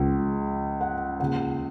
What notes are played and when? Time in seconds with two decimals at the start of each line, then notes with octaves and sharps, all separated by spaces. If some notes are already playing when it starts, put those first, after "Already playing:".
Already playing: C#2 C#3 F3
0.81 F#5
1.20 D#2 C#3 F3 F#5